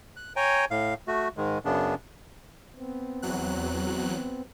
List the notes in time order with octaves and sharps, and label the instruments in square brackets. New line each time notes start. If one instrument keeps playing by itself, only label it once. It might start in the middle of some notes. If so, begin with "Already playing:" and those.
[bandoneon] F#6
C#5 G5 G#5 A#5
A2 F5
A3 F#4
G#2 D#3 G#3
F#2 C#3 B3 D4
[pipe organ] B3 C4
[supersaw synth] E2 F#3 F#6